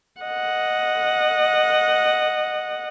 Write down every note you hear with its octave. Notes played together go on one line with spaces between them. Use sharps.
D#5 F#5